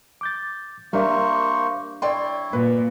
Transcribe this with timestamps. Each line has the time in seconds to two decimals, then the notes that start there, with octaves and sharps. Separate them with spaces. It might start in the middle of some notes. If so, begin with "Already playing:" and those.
0.21 D6 G6 A6
0.93 G3 A#3 D4 A#4 C5 E5 C#6
2.02 E4 C#5 D5 G5 C6
2.53 A#2 B4